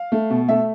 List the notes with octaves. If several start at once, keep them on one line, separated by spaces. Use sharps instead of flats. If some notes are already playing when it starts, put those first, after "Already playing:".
Already playing: F5
A3
B2
A3 E5